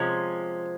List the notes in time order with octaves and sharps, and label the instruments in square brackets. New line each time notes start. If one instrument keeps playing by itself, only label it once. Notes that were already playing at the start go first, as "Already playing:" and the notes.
Already playing: [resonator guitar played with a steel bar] C3 F3 G#3 C#4